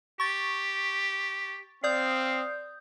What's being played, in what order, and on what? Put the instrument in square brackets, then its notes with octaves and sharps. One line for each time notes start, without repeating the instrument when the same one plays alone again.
[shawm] G4 [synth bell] C#6 A6
[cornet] C4 [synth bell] D5 D#6 G6 [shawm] F5